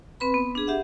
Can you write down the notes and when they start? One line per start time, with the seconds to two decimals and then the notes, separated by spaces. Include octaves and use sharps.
0.20 C4 B4 B5
0.34 B3
0.55 D4 G#4
0.67 G4 E5 F#5